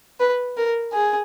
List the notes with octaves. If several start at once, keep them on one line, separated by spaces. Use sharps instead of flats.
B4
A#4
G#4